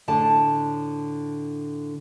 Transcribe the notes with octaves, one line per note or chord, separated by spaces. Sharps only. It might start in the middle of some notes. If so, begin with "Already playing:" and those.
A2 D3 A5